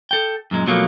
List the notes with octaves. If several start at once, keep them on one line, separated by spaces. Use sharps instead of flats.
A4 G5
F#2 A#2 G#3
B2 F3 F#3 A3 A#3